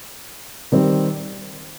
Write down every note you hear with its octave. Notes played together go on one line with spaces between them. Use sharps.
D#3 G3 C4